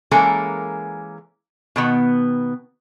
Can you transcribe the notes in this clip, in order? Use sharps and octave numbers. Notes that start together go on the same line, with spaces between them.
E3 G#3 A#3 C#4 A4 A#4
B2 D#3 B3